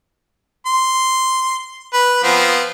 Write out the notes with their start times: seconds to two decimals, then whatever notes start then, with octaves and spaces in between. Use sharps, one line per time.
0.66 C6
1.93 B4
2.24 F3 B3 C4